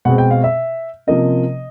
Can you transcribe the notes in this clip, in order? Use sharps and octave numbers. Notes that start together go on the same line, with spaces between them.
B2 G#3 C4 F#5
G5
F5
E5
C3 F3 A#3 C#4 D#5